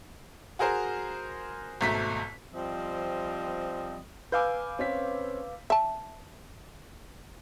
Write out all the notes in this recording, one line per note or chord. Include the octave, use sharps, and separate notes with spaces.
F#4 G#4 A#4 C5
G#1 B2 A3 A#5 B6
F3 G3 C4 D#5
B4 F5 G#5 D6 E6 G6
C4 C#4 B6
E5 A5